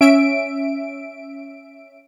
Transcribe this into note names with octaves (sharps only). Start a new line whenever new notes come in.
C#4 E5 D7